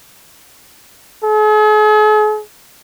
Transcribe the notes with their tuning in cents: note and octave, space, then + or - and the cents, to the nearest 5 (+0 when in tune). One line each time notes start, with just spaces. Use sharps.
G#4 +45